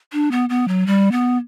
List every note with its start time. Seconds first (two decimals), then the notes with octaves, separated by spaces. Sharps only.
0.13 D4
0.31 B3
0.49 B3
0.68 F#3
0.87 G3
1.12 B3